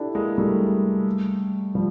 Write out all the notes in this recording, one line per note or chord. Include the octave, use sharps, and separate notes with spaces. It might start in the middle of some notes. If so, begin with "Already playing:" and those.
Already playing: D4 E4 G4 A4
G#3 A#3
G3 A3
F3 G3